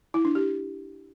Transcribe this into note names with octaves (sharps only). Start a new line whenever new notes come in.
E4
D4
G4